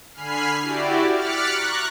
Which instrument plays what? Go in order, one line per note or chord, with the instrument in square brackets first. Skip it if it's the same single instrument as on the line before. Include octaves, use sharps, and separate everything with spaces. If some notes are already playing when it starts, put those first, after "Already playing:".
[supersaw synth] D3 G#5 B5 F6 C7
E4 F#4 G4 D5
D6 F6 F#6 A6 B6 C#7
A#5 C#6 F#6